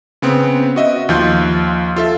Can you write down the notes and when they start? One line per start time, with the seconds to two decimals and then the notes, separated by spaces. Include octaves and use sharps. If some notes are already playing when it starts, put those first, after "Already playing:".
0.22 C#3 B3 C4
0.76 F#4 D#5 E5
1.09 D#2 F3 F4 G6
1.96 F4 A4 E5